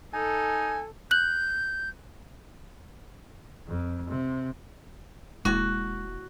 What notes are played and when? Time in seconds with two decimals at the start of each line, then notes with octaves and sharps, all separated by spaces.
0.14 D#4 A4 G#5
1.11 F#6 G6 F#7
3.67 F2
4.09 C3
5.45 E1 G#3 A#3 E4 F#4